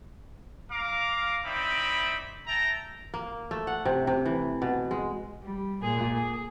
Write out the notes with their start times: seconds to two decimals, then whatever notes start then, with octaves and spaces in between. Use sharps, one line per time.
0.71 F5 A#5 D6
1.45 C4 D#4 E4 D5 E5 B5
2.47 E5 G5 A5 A#5
3.14 A#3
3.51 A3
3.67 F#5
3.85 C3
4.07 C3
4.25 E3
4.62 B2
4.91 G#3
5.41 G3
5.82 A#2 G#4
6.15 G#4